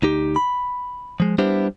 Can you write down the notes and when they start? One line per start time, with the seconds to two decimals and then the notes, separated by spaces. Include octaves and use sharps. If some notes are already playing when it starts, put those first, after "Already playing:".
0.02 D2 D#4 G4
0.36 B5
1.20 F3 G#3
1.38 G3 B3 D4 E4 G4 C5